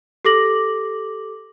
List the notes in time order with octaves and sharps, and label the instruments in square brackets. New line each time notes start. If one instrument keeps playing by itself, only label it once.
[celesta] G4 A4 D6 A#6 F#7